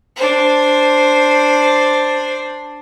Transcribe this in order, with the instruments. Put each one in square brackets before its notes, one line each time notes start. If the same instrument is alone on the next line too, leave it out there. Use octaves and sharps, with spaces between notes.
[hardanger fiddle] D4 C5